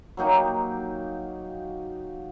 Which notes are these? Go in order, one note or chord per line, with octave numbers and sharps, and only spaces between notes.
F#3 A#3 D#4 G4